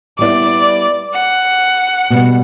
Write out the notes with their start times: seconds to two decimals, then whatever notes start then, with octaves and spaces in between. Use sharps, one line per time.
0.19 G3 B3 E4 D5
1.14 F#5
2.10 B2 G3 B3